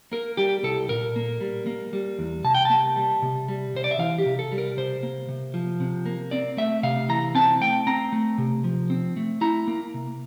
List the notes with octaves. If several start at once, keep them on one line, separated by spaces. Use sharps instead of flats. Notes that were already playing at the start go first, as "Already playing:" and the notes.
A#3 A#4
G3 G4
C2 A4
A#2 A#4
A#3
G3
A#3
G3
E2
C3 A5
G5
A#3 A5
G3
C3
G3
C3 C5
D5
E5
E3 F5
G4
C3
A4
G3
A#4
C3 C5
A#3
C3
F3
C3
A#3
C4 D5
A3 E5
C3 F5
E3 A#5
C4 A5
A3 G5
C4 A#5
A3
C3
F3
C4
A3
E4 A#5
A#3
C3